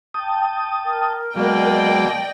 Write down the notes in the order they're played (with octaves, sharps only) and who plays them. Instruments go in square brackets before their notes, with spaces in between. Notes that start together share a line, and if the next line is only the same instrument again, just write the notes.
[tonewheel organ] G5 A5 D#6
[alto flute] A#4
[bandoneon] B2 A#3 [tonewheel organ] F#3 G#3 [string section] D5 D#5 G5